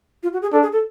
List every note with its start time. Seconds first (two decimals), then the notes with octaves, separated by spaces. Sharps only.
0.23 F4
0.33 F#4
0.42 G#4
0.52 D4 A4
0.62 G#4
0.73 A4